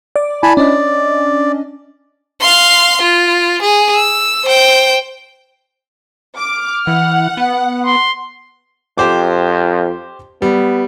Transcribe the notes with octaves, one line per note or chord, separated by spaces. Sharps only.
D5 D6
E4 G#5 A5 B5
C#4 D4 D5 D#5
F5 C6
F4
G#4
E6
C5 G5
D6 F6
E3 F#5
B3
C6
F2 G4 C5 D6
G3 B3